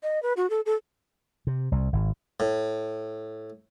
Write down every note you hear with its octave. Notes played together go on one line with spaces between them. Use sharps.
D#5
B4
F#4
A4
A4
C3
C2
G#1
A2